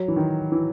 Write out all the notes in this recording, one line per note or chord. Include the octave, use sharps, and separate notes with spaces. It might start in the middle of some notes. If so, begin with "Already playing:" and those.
Already playing: F#3
E3
D#3
E3